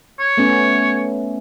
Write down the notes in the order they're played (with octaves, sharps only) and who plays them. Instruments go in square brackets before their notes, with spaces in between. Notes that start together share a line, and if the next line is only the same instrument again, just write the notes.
[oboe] C#5
[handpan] A3 B3 C#4